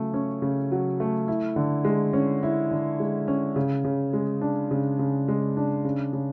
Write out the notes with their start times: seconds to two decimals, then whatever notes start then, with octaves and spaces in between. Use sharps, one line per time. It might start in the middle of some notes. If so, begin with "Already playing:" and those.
Already playing: C#3 F#3 A3
0.14 C#4
0.42 C#3
0.72 F#3
1.00 A3
1.28 E4
1.56 D3
1.85 G#3
2.13 C#4
2.43 E4
2.71 D3
3.00 G#3
3.28 C#4
3.56 C#3
3.85 C#3
4.13 G#3
4.41 D4
4.71 C#3
4.99 C#3
5.28 G#3
5.57 D4
5.85 C#3
6.13 C#3